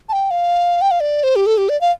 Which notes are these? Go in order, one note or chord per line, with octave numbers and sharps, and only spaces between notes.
A5
G5
F5
G5
F5
D5
C5
G4
A4
G4
D5
F5